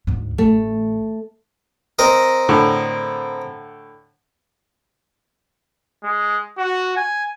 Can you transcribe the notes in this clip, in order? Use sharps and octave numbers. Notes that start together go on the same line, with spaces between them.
D2 G#2
A1 A3
C4 A#4 D#5
A2 D3
G#3
F#4
G#5